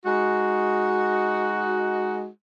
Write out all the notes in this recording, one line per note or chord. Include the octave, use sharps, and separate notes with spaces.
G#3 D#4 F#4